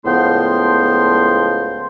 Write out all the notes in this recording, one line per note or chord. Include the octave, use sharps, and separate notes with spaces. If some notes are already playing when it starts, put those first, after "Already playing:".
C#2 A2 F3 B3 G5 C6